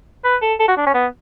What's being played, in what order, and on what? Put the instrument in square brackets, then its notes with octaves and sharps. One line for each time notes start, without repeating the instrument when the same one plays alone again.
[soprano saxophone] B4
A4
A4
F#4
D4
C#4
B3